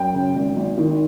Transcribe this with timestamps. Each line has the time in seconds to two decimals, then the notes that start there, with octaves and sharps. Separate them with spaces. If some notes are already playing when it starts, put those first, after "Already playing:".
Already playing: F#2 G5
0.14 C#3
0.35 G#1
0.56 G#1
0.78 D#3